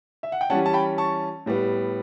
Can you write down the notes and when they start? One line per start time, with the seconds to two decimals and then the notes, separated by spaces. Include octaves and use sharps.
0.23 E5
0.32 F#5
0.41 G5
0.50 E3 G3 C#4 F#5 A5
0.66 A5
0.73 G5 B5
0.98 A5 C#6
1.46 A2 G3 B3